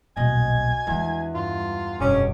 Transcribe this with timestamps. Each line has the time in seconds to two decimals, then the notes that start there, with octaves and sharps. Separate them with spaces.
0.17 D#1 B1 F#4 D#5 G#5
0.87 E2 G#3 D4
1.34 G2 F4
2.00 F1 G2 B2 C#4 G#4 D6